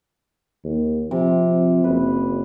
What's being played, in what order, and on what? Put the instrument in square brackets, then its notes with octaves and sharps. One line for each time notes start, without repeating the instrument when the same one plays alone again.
[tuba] D#2
[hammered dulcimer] C3 [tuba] F3
[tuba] F#1 [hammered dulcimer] B4